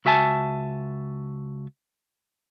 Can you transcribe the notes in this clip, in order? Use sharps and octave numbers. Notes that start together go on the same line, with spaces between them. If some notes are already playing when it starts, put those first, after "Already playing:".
C#2 F#4 E5 G#5 A5